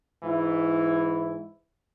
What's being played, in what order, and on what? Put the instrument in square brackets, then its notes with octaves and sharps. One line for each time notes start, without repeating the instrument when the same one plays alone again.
[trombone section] G#2 E3 E4